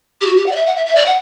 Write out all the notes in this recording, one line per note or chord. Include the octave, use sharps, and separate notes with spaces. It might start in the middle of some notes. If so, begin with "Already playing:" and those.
G4
F#4
G4
F#5
D5
E5
F#5
E5
E5
D5
F#5